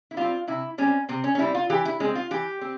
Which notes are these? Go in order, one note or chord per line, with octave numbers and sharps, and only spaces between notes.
E4
G3 C4 F4
C3 E4
G3 C4 C#4
C3 C4
C#4
C#4
G3 C4 E4
F4
E3 G4
E4
G#3 C4 C#4
F4
E3 G4
C4